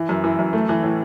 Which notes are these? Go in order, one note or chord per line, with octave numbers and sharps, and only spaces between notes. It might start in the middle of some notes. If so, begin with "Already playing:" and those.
Already playing: E3
F#2
E3
F#2
A3
E3
A2